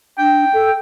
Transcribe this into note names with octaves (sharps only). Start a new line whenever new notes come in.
D4 G5
A4